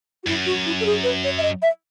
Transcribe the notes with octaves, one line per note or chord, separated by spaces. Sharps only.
F#4
F#2 E4
F#4
E4
A4
G#4
B4
C#5
E5
D#5
E5